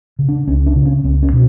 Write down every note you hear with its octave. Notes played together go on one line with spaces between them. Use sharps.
C#3
D4
C#2 C#4
D4
C#3
C#4
C#2 B3
C#4
B2